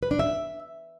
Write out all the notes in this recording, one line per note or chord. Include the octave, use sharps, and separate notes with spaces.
B4
D4
E5